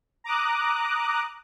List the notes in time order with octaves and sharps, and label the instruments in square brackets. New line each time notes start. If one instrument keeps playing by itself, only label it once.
[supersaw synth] A#5 D6 D#6 F#6